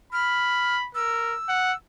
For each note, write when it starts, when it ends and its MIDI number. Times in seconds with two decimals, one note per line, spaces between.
0.13 0.88 83
0.13 0.76 89
0.95 1.35 70
0.95 1.76 88
1.49 1.72 78